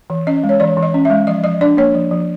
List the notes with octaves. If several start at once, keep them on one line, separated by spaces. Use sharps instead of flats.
E3
C#4 D#5
G#3
C#5
E3 D5
E3
D#5
C#4
E5
G#3
F3 D#5
F3 D#5
D4 D5
A#3 C#5
F3
F3